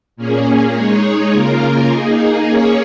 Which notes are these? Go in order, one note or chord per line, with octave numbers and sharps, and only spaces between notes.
A#2 A#3 C#4 G#4
G#3 D#4 G#4 C#5
C#3 A#3 F4 A#4
A#3 D#4 G#4
A#3 C#4 G#4 C#5